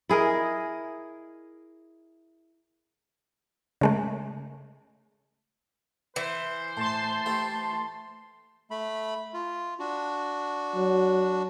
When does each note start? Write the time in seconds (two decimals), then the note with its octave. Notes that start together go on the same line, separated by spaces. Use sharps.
0.09 E4 G#4 A#4 D#5
3.81 C#3 G#3 A3
6.16 E3 C5
6.77 A2 A5 C6
7.26 A3 E4 G4
8.71 A3 B5
9.34 F4
9.79 D4 F#4
10.75 F#3